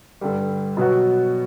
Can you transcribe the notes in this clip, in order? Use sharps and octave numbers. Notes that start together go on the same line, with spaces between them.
G2 D3 G3
B2 F#3 B3 F#4